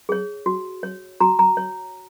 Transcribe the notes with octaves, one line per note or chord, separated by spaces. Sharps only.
G#4 C#5
F#4
C#5
F#4 A#5
A#5
C#5